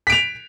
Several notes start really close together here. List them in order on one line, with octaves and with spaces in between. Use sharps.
B6 D7 F7